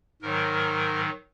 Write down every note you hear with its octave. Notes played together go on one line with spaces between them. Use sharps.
G#2 D#3 F#3 A#4